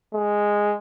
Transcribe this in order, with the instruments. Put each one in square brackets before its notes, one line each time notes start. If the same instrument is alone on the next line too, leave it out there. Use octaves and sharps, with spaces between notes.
[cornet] G#3